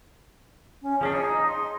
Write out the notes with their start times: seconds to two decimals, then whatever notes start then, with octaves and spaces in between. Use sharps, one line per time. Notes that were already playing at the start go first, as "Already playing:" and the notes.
0.82 C#4
1.01 F3 C#4 D4 G#4
1.13 D#4
1.48 C6